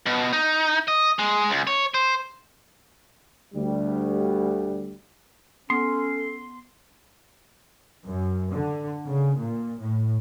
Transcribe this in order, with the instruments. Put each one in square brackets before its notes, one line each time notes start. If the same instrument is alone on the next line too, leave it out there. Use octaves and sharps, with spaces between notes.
[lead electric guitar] B2
D#4
D#5
G#3
C#2
C#5
C5
[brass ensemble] D2 G3
[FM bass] B3 [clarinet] C#4 [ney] A4 [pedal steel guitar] C6
[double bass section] F#2
D3
C#3
A#2
A2